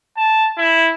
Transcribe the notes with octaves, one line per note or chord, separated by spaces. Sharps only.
A5
E4